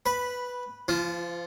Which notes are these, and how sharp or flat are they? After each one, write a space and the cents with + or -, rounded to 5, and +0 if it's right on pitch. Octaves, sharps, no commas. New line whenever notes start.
B4 +0 B5 -10
F3 -30 F4 +0